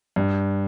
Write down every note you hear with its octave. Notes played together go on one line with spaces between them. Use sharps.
G2